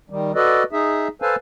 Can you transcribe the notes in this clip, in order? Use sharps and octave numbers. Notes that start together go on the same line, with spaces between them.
D#3 G3
F#4 A4 B4 D5 D#5
D#4 G#4 E5
A4 B4 C5 F5 G#5 A5